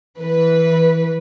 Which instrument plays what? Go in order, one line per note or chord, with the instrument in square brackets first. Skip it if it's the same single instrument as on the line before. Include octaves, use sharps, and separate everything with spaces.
[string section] E3 B4